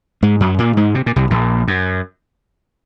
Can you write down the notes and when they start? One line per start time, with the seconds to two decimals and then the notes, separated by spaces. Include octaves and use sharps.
0.23 G#2 G#3
0.40 F#2 F#3
0.59 A#2 A#3
0.77 G#2 G#3
0.95 C3
1.06 A#2
1.16 C2 C3
1.30 A#1 A#2
1.68 F#2